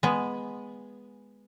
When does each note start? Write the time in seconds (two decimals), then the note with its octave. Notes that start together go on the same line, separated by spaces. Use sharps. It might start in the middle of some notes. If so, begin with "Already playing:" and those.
0.03 G#3 B3